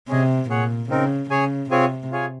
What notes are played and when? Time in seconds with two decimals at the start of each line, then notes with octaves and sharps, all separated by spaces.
0.08 C3 C#4 G#4 D#5 G#5
0.50 A#2 G#4 C#5 F#5
0.90 C#3 C4 D#4 A#4
1.30 C#3 G#4 C#5 G#5
1.71 C3 C4 F4 G#4 C#5 G#5
2.11 F4 G#4 C#5 G#5